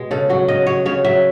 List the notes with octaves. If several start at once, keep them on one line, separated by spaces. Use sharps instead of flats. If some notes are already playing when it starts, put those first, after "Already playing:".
Already playing: B2 G#3
C#3 A4
F#3 F#4
C#3 D#5
F#3 C#5
C#3 C#5
F#3 E5